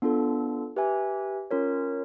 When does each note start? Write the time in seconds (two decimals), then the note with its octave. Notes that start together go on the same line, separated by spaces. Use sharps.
0.02 B3 D4 F4 A4
0.76 G4 B4 E5 G#5
1.51 C#4 F4 A#4 C#5